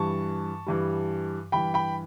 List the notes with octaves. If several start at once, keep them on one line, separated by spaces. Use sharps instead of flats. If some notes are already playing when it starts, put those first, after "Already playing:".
Already playing: G2 E3 G3 A5 C#6
G2 E3 G3
G2 E3 G3 G5 B5
G5 B5